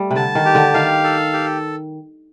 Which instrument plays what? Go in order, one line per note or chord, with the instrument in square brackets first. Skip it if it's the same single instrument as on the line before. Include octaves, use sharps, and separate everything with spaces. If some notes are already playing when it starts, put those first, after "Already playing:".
Already playing: [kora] G3 A3
C3
[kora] D3 [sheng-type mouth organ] A5
[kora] D#3
[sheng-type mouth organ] G4
[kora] D3
[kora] D#3 [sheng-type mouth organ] F5
[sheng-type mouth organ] A4
G4